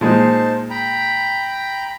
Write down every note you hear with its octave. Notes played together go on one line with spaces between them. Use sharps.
A#2 G#3 D#4 C5 A5
G5 A#5 B5